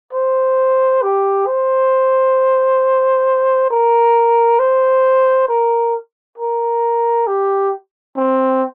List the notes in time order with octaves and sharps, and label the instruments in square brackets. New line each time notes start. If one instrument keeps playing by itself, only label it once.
[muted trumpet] C5
G4
C5
A#4
C5
A#4
A#4
G4
C4